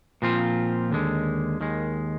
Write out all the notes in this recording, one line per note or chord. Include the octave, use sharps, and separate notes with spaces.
A#2 F3 C4 F4
D#2 D3 G#3
D#2 D#3 G#3